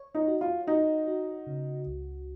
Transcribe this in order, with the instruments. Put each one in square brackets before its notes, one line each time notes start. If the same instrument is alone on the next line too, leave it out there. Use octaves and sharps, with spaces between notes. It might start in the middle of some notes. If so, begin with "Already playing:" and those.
Already playing: [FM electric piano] C#5
[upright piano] D#4
[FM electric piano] F#4
[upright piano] F4
[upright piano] D#4 [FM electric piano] F#4
[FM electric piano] F#4
C#3
C#2